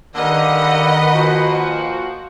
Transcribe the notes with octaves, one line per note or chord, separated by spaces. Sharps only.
D3 D#3 G3 A#3 B4 D#5 F#5 A#5
A#2 F3 F#4